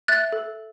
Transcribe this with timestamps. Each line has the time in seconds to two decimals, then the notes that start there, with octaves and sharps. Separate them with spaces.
0.08 E5 F#6 A6
0.32 A4